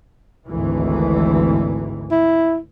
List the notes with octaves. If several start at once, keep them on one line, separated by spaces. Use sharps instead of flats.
G#1 D2 E3
E4